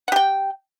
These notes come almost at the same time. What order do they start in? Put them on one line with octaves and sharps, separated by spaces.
F#5 G4 G5